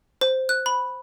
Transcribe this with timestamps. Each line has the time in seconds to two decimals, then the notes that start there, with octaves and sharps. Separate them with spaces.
0.21 C5
0.49 F#6
0.66 B5